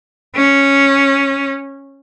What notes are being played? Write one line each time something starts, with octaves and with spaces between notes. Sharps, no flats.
C#4